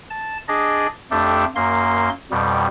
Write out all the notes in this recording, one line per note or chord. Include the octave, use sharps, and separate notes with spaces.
A5
D4 G#4 D5 D#5
F2 A3 D4 G4 A4
F#2 A#3 C6
F2 B2 G3